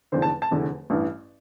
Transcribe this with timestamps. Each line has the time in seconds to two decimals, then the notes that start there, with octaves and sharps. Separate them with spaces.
0.12 F1 E2 D3 C5
0.22 A5
0.42 A5
0.51 F1 E2 D3
0.90 A1 G2 E3